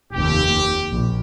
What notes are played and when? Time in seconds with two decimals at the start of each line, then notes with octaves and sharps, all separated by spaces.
0.13 F1 D#2 G4
0.91 A#1